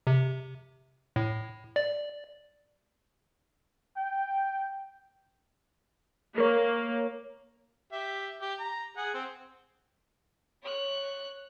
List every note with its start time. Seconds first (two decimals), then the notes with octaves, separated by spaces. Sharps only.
0.07 C3
1.16 A2
1.76 D5
3.97 G5
6.38 A#3 A#4 C#5
7.92 G4 E5
8.41 G4
8.60 A#5
8.97 G#4 F#5
9.14 C4
10.62 C#5 F#6